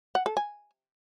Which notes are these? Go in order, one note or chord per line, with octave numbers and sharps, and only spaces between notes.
F#5
A4
G#5